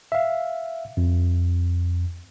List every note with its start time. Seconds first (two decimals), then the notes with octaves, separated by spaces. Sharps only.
0.12 E5 F5
0.97 F2